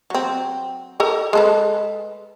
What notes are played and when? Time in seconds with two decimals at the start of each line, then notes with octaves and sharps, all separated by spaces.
0.10 F#3 C4
1.00 A4 A#4 D#5
1.33 G#3 A4 B4